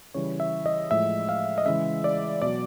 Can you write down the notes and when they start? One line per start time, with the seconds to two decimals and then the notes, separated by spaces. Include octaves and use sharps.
0.14 C#3 E3 G3 C#5
0.40 E5
0.66 D#5
0.91 A2 F3 G#3 E5
1.29 F5
1.58 D#5
1.66 C#3 E3 G#3 E5
2.04 D5
2.42 B2 F#3 D5